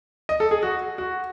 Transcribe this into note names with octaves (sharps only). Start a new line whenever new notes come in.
D#5
A4
G#4
F#4
F#4